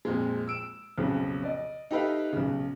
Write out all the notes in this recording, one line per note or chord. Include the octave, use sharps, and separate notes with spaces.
F2 A#2 G#3
E6 D7 E7
B1 F2 C#3 B3
D5 D#5
D#4 G4 A4 B4 E5 F5
B1 C#3